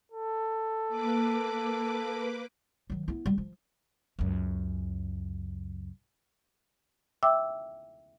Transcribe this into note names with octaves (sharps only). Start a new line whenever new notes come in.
A4
A#3 B4 D6
D#3 F#3
B3 E4
G3
F3
C#2 F#2
E5 G5 D6 E6